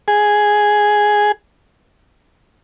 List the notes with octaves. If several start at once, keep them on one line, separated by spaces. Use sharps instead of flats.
G#4